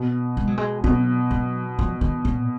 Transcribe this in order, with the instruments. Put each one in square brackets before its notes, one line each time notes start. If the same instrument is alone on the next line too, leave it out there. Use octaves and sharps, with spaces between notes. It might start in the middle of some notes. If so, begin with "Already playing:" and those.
Already playing: [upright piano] B2
[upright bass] G#3
F#3
G#3
[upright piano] B2 [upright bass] F#3
[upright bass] F#3
F3
D#3
A#2